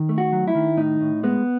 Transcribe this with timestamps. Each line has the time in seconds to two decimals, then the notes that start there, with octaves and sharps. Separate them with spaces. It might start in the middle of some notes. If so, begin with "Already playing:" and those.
Already playing: D#3
0.09 A3
0.18 F#4
0.32 F#3
0.48 E4
0.55 D#3
0.77 A2 D#4
1.01 A2
1.23 G#3 B3